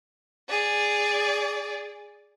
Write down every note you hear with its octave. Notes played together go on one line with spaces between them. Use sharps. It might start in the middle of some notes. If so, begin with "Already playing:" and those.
G#4 D5